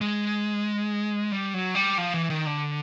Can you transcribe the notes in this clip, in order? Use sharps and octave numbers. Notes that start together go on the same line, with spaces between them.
G#3
G3
F#3
G3
F3
E3
D#3
D3